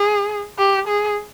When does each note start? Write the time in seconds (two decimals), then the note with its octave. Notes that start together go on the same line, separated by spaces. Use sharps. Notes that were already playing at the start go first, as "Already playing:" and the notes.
Already playing: G#4
0.58 G4
0.88 G#4